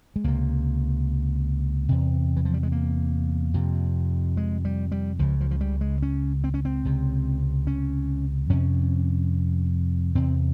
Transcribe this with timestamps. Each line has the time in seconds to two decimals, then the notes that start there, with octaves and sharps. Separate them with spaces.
0.16 G#3
0.24 C#2 C3 A#3
1.89 E2 C3
2.36 E3
2.45 F3
2.54 G3
2.63 G#3
2.72 A#3
3.54 F2 C3
4.37 G#3
4.65 G3
4.92 G3
5.19 C#2 C#3 F3
5.41 F3
5.51 F3
5.61 G3
5.81 G#3
6.02 C#4
6.44 C4
6.54 C#4
6.65 C4
6.85 C#2 C3
7.67 C#4
8.50 F2 C3 C#4
10.15 E2 C3 C4